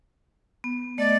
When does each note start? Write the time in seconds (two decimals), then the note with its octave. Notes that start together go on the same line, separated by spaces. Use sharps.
0.64 B3
0.98 A3 D5 D#5